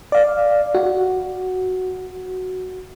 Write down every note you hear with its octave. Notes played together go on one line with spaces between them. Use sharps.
D5 F5
F#4